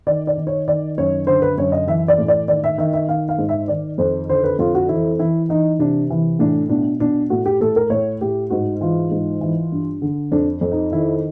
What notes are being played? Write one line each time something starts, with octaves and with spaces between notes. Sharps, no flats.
D#3 D5
D5
D#3
C#5
D#3 D5
F#2 C#5
D3 C5
B4
F#2 C#5
D#5
E3 E5
D5
A2
D5
D#3 D5
E5
D#3 E5
E5
D#3 F5
F5
G#2
E5
D#3 D5
F2 C5
D3 C5
B4
F2 F4
F#4
E3 E4
E3 E4
E3 D#4
C3 D4
E3
A2 D4
B2 D4
B2 D4
A2 F#4
G4
A2 A4
A#4
A2 C#5
A2 G4
G#2 F#4
E3 F4
G#2
E3
G2
D3
F2 D4
F2
D#4
D#3 E4